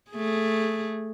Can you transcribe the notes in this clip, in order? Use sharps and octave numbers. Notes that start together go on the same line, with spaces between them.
A3 G#4